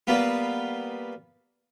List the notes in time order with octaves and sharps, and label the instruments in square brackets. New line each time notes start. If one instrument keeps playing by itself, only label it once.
[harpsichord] G3 A#3 B3 F4